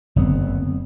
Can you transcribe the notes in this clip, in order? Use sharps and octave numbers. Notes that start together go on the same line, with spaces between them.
F#1 D2 B3 C4